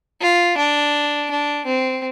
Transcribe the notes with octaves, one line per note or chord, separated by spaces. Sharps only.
F4
D4
D4
C4